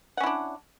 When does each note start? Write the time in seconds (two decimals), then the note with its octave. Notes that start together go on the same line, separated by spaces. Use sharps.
0.17 F#5
0.20 C#4
0.23 E4
0.26 D4